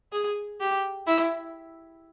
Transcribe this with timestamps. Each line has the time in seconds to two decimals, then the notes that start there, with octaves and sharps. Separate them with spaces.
0.12 G#4
0.60 G4
1.06 E4